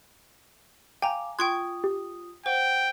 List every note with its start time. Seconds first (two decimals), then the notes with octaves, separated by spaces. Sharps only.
1.02 F5 G5 G#5 A#5 D6
1.39 F4 G5 C6 C#6 D#6 F#6 G#6
1.84 G4
2.46 C5 F#5 G5